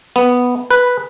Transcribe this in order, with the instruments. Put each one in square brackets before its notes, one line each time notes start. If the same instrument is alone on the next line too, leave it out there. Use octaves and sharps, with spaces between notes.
[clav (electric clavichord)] B3
B4